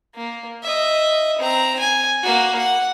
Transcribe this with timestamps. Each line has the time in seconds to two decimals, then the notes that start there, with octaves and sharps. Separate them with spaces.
0.15 A#3
0.63 D#5 E5
1.39 C4 A#5
1.79 G#5
2.23 A#3 F#4
2.59 F#5